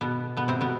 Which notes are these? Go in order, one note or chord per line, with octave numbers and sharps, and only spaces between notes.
B2 B3
B2 B3
C3 C4
B2 B3